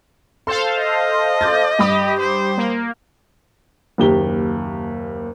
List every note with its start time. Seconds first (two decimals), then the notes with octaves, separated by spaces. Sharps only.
0.47 A4 C5 F5 C6
0.78 D#5
1.41 D6 G6 A6
1.79 G2 G4 B5 D#6
2.20 C5
2.58 A#3
3.98 F#1 D#2 G4 G7